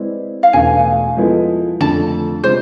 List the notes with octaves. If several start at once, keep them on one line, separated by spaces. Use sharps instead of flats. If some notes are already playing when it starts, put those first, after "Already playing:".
Already playing: G#3 C4 E4 B4 D5
F5
E2 B2 A3 D4 G#5
F3 G#3 B3 E4 A4
F2 D3 F3 A3 D4 A5
C3 G#3 D4 F4 G#4 C5